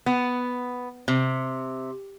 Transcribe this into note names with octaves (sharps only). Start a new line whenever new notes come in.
B3
C3